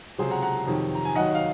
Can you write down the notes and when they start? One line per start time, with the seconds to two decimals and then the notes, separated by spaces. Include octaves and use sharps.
0.18 C#2 C3 F#3 G#4 C5
0.31 F#5 A#5
0.42 F#5 A#5
0.67 F2 C3 D#3 F#3
0.95 A#5
1.05 G#5
1.15 D#2 D#3 F#3 D#5 F#5
1.35 F5